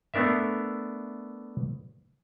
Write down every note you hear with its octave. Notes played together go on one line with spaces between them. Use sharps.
A3 B3 D4 A#4 E5